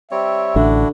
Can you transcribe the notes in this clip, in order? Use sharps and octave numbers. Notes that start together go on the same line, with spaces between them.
G3 C4 C#5 E5
A1 D3 D4 E4 F#4